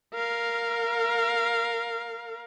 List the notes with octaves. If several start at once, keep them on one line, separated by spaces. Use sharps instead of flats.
A#4 F5